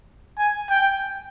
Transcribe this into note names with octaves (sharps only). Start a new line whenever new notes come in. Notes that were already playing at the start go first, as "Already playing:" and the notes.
G#5
G5